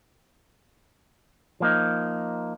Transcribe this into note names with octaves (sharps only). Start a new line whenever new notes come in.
F3 A#3 D#4